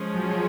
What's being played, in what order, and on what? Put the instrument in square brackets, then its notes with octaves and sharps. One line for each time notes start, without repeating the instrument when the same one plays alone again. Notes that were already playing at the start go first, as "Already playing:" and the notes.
Already playing: [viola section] F3 G#3 C#4 G#4
[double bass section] F#3